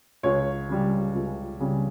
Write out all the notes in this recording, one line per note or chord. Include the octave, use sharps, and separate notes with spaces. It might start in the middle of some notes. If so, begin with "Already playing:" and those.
C#2 C#5
C#3 G3
C#2
C#3 G3